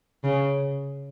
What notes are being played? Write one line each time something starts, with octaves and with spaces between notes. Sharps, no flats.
C#3